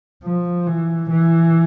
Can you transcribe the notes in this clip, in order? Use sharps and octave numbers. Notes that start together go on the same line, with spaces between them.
F3
E3
E3